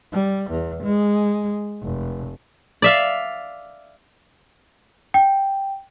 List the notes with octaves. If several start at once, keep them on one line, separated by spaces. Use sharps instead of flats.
G3
E2
G#3
F1
D5 E5 F5
G5